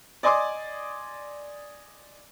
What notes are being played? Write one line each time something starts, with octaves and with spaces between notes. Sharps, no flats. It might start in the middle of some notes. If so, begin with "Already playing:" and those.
D5 D#5 G#5 C6 D6 D#6